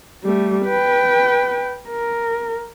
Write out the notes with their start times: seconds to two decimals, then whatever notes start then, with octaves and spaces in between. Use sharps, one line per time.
0.24 G3 A3
0.65 B4 G5
1.88 A#4